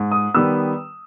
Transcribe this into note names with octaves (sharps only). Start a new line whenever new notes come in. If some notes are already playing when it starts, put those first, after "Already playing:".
Already playing: G#2
D#6
D#3 G3 B3 E6